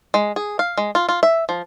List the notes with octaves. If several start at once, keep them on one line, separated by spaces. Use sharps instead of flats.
G#3
G#4
F5
G#3
F4
F4
E5
F3